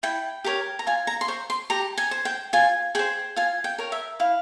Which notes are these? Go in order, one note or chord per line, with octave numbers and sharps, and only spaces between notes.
E4 G5
G4 A#4 C#5
A#5
F4 G#5
A#5
C6
C5 C#6
C6
G4 A#5
G#5
C5
G5
F4 G#5
G#4 C5 G5
F4 G#5
G5
A#4 C#5
E5
E4 F5